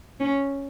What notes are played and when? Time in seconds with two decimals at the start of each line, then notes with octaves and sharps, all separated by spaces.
0.20 C#4